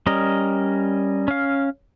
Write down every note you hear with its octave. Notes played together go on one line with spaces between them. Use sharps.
G3 C#4 A#4 D#5
C#4 F5